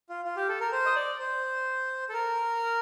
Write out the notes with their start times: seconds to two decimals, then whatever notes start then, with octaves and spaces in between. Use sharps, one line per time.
0.09 F4
0.25 F4
0.37 G4
0.48 A4
0.60 A#4
0.72 C5
0.86 D#5
0.96 D5
1.19 C5
2.09 A4
2.13 A#4